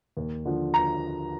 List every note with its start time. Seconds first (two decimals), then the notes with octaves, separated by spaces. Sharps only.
0.17 D#2
0.45 D3 F3
0.74 A#5